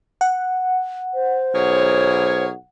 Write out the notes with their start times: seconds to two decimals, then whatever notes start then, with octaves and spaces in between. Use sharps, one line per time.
0.21 F#5
1.14 C5
1.54 B1 G#4 A#4 C#5